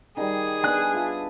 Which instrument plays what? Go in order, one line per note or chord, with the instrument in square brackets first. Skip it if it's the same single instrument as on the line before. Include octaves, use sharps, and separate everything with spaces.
[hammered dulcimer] D#3 G3 [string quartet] G#4
[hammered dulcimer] B3 D4 [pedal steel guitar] G#5 F#6
[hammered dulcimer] F4 E5 A5